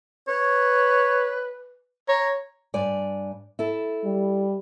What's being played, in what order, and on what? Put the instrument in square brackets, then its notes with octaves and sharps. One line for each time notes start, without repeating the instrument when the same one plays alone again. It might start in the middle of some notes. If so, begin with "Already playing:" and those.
[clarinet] B4 [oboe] C#5
[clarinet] C#5 [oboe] A#5
[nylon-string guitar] G2 D5 G#5
E4 A4
[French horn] G3